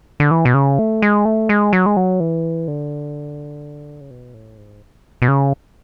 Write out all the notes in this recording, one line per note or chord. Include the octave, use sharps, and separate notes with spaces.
D3
E3
B2
C#3
A3
G#3
A3
G#3
F#3
G#3
F#3
E3
D3
C#3
B2
A2
G#2
B2
C#3